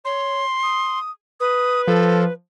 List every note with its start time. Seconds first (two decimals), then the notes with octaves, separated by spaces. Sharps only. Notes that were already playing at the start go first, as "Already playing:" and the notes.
0.05 C#5 C6
0.63 D#6
1.40 B4 D#6
1.87 F3 A4